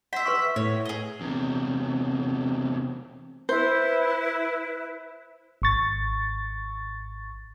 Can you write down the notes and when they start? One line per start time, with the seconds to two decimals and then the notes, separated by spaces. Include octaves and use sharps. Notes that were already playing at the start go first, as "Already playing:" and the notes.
0.13 C5 E5 F#5 B6
0.26 B4 C6 C#6
0.56 A2 C#5
0.85 G#4 D#5
1.21 E2 C3
3.49 E4 B4 C5
5.62 G#1 C#6 A6